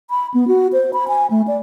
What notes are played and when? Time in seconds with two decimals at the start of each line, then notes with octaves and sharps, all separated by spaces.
0.10 B5
0.34 B3
0.48 F#4
0.73 C5
0.93 B5
1.08 G#5
1.31 A3
1.47 D5